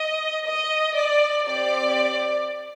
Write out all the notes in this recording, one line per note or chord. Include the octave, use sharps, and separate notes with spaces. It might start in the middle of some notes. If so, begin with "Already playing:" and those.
Already playing: D#5
D#5
D5
C4 G4 D5